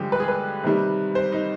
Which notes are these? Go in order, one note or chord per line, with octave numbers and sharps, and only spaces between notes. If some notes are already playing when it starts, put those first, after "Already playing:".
Already playing: G2 D3 F3 G#3 G4
B4
G#4
B4
C3 D#3 G3
C5
D#4